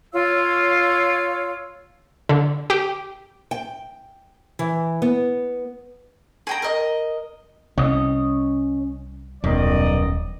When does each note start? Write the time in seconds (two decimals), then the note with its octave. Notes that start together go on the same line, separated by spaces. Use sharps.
0.13 F4 C#5 F5 E6
2.29 D3
2.70 G4
3.51 G5
4.59 E3
5.02 B3
6.47 G#4 G5 A#5
6.62 A#4 D#5
7.78 C2 C#4 D#5
9.44 D#1 B1 F#2 D#3 D5 D#5